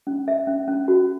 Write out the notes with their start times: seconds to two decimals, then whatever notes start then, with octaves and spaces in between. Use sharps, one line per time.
0.07 C#4
0.28 E5
0.47 C#4
0.68 C#4
0.88 F#4